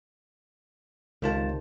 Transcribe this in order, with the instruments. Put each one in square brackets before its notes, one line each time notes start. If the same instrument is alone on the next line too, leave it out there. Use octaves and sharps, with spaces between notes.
[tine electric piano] C#2 F4 A5 [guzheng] C3 D#3